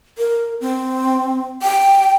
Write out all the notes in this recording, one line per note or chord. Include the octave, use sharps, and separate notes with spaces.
A#4
C4
G5